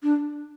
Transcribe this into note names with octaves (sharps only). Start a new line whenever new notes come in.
D4